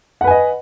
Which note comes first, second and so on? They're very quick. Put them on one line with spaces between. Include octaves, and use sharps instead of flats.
F#5 B4 G#5 D#5